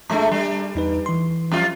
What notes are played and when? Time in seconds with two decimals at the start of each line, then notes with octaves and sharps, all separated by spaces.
0.10 A2 G#3 A3 D4 A#5
0.32 G3
0.75 E2 D#4 B4
1.06 E3 C6
1.51 F2 G3 F4